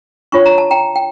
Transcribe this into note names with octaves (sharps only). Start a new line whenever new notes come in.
D4 F4 C#5 C#6
A#5
A5
G5 A#5
G5